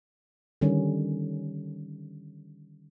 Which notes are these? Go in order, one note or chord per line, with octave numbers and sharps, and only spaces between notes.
D3 D#3 G3 C#4